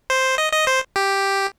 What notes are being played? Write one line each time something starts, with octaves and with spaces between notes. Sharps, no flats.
C5
D#5
D#5
C5
G4